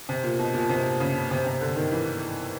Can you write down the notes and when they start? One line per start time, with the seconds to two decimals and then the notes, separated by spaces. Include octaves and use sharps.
0.09 C3
0.24 A#2
0.39 B2
0.54 A#2
0.69 C3
1.00 C#3
1.31 C3
1.46 C3
1.61 D3
1.76 D#3
1.92 E3